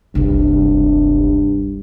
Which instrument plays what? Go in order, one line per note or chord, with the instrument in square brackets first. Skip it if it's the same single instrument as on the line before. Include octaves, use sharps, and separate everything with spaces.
[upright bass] F1 C2 [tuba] G2